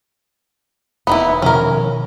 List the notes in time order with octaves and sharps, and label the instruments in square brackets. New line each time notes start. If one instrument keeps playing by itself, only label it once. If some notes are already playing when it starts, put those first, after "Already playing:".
[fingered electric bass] E1 [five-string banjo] B3 D#4 E4
[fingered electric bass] B2 D#3 F3 [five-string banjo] C#4 A#4